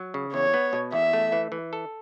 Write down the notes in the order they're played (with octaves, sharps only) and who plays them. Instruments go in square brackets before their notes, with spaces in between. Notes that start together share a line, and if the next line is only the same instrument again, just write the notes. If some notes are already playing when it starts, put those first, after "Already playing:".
Already playing: [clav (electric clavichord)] F#3
C#3
[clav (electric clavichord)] E2 [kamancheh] C#5
[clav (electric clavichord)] B3
B2
[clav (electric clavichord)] E2 [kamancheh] E5
[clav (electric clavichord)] A3
E3
E3
A4